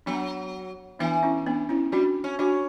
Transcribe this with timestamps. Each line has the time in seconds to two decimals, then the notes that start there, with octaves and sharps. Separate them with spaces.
0.06 F#3 B3 D4
0.99 E3 B3 D4
1.23 C#4 E4
1.46 B3 D4
1.69 C#4 E4
1.92 G3 D4 F#4
2.24 C#4
2.39 C#4 D4 F#4